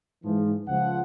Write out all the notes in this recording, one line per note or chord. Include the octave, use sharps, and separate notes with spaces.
G#2 E3 F3
C#2 F3 F#5